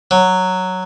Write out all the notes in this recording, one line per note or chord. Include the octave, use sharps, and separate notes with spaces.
F#3